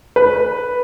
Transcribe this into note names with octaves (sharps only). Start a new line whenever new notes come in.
B4